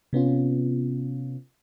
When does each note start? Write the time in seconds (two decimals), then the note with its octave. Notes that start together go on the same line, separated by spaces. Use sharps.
0.13 C3 B3 C#4 F4